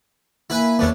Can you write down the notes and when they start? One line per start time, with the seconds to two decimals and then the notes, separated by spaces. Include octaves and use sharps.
0.50 A#3 E4 B4 G#5
0.79 E2 A3 B3 C#4 D4